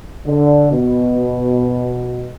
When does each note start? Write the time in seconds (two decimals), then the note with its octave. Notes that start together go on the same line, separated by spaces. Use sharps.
0.27 D3
0.71 B2